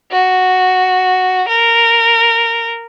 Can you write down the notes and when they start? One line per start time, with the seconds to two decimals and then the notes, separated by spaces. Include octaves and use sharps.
0.11 F#4
1.49 A#4